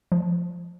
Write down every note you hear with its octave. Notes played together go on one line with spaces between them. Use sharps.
F3